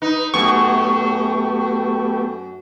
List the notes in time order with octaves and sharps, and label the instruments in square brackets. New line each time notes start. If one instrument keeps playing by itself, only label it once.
[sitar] D#4 [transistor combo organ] B4
[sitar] F#2 [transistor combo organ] A3 B3 G4 [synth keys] C#6